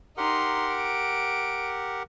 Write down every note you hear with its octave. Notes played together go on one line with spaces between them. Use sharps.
D#4 G4 A#4 F#5 C6
D7